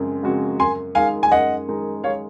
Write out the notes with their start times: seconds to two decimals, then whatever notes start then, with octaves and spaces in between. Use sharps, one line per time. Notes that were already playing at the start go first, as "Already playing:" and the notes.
Already playing: F#2 C#3 G#3 C4
0.23 C#3 G#3 C4 F#4
0.59 F#2 G#5 C6
0.95 D#3 G#3 D#4 F5 G#5
1.23 G#5
1.31 F#2 D#5 F#5
1.68 D#3 G#3 D#4
2.04 C#5 F5